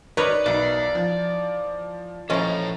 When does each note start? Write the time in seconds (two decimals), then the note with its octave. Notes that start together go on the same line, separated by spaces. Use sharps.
0.17 D#4 A#4 B4 C#5 D5
0.46 B1 E3 D#4 D5 F#5
0.95 F3
2.30 E3 F3 C#4 A4 C#5 D#5 A#5